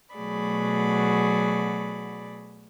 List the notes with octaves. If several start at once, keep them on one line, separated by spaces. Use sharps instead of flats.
B2 F#3 A3 G#4 D5 B5